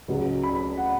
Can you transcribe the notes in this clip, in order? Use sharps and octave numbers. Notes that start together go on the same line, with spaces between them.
C#2 C#3 F#3
B5
F#5